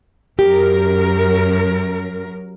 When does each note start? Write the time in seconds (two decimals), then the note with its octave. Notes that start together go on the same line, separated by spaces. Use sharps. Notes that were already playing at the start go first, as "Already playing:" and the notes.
0.39 F#2 G4 A#4